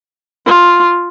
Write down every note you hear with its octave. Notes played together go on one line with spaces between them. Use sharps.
F4